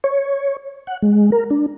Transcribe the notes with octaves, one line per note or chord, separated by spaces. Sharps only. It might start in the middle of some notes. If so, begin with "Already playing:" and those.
C#5
F#5
G#3
A#4
D4